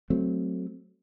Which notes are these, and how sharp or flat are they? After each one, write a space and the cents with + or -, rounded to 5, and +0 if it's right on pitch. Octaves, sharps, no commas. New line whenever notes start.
F#3 +0 A3 +0 C4 +0